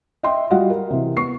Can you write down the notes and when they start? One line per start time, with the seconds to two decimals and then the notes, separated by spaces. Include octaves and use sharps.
0.23 D#5 E5 G5 C6
0.50 G3 F4 F#4 D#5 F5 F#5
0.70 A#4
0.90 C3 E3
1.17 B3 C#6 C7